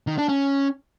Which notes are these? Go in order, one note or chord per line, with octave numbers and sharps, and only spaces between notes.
D#3
D4
C#4